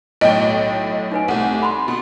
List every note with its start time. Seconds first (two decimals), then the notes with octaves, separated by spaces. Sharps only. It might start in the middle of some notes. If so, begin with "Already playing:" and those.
0.21 B1 A2 D#5 G5
1.12 D#4 B4 G#5
1.28 C2 A3 F#5
1.63 B5 C6
1.88 B2